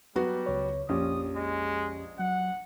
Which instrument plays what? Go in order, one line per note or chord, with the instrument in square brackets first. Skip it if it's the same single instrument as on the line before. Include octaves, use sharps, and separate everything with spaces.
[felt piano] F#3 B3 F#4 [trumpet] G3
[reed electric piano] C#2 C#5
[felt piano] A#1 [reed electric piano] F2 C#4 G4 [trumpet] D#6
[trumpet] G#3
[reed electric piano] F#3 [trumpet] F#5